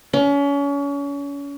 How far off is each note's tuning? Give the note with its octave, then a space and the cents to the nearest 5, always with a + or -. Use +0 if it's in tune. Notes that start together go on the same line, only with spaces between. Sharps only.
C#4 +35